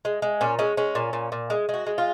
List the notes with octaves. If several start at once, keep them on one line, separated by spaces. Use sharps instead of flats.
G#3
G#3
A#2 C#4
G#3 C#4
G#3 C#4
A#2
A#2
A#2
G#3
G#3 F#4
G#3
F4